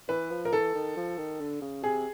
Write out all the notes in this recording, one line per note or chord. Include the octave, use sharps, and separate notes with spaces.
E3 B4
F3
A#4
E3 A4
D#3
F3
D#3
D3
C#3
C3 G#4